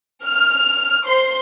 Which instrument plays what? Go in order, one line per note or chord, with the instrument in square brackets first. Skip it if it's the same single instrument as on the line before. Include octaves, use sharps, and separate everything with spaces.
[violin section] F6
C5 C6